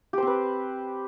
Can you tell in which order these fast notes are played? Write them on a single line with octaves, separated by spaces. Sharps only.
G4 C5 C4 B4